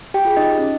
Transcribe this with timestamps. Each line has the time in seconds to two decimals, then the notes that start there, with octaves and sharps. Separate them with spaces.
0.14 G4 G5
0.25 F4 G#4
0.37 D#4 D#5
0.59 C#4